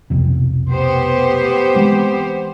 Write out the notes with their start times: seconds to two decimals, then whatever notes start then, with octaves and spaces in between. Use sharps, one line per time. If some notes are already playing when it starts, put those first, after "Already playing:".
0.10 B1 F2 C3
0.71 B3 G4 C5
1.75 E3 G#3 C4